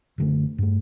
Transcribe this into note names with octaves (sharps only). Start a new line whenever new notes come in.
F#1 D3 A3
G2 A3